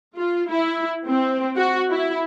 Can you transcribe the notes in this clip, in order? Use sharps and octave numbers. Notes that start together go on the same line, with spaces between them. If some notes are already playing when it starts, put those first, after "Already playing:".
F4
E4
C4
F#4
E4